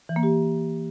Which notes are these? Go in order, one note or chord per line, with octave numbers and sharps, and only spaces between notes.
E3
A#3
G4